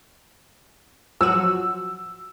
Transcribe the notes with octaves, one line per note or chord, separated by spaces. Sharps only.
F3 F#3 F#4 E6